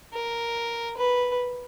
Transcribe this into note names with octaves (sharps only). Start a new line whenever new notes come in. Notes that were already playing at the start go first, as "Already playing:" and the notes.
A#4
B4